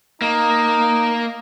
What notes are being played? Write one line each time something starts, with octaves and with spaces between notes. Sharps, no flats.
A#3 D#4